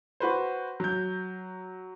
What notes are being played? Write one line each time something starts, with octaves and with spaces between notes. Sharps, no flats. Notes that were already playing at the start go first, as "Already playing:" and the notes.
F#4 B4 C5
F#3 G6